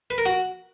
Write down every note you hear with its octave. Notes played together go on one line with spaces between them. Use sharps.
B4
A#4
F#4